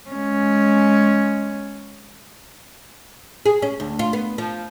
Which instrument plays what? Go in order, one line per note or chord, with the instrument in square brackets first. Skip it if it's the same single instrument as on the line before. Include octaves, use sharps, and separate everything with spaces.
[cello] G#3 C#4
[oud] G#4
C#4
D2
F4
B3
F3